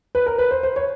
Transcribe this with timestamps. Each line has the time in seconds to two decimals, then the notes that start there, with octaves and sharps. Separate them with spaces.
0.15 B4
0.26 A#4
0.38 B4
0.51 C5
0.63 C5
0.76 C#5